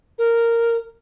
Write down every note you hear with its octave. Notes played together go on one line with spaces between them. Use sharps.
A#4